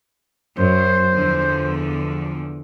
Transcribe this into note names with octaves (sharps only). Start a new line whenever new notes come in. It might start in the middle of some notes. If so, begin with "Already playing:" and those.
F#2 C5
E2 D3 F3